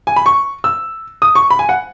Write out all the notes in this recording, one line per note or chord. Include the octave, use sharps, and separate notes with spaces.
G#5
B5
C#6
E6
D#6
C#6
B5
G#5
F#5